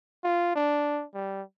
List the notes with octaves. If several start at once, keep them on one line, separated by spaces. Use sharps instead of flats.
F4
D4
G3